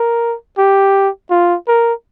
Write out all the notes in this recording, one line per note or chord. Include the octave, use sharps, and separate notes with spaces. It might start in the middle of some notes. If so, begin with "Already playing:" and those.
Already playing: A#4
G4
F4
A#4